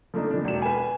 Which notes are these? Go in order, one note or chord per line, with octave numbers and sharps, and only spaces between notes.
F3 A3 A#3 D4 D#4
E3 D4
E1 E7
B4 G#5